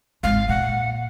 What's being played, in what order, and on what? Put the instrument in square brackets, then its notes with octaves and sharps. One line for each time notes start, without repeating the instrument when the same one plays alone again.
[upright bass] G#1 G#3 [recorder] F5
[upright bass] A#2 [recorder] F#5